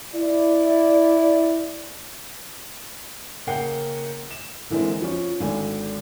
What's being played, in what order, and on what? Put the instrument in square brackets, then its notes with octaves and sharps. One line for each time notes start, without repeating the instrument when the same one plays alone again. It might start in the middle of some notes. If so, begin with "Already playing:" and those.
[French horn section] E4 D5
[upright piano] C#3 A#3 F#5 G5 C7
E7
D3 E3 G#3 A#3 C4
F3 C#4
G#1 D3 G#5